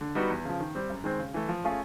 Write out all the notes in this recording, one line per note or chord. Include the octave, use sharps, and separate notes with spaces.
D3
G3 B3 D#4 F#4
E2
C#3 F3
D#3
G3 C4
F#2
D#3 G#3 C4
C#3
E3 A3
F3
A3 C#4 F4 G#4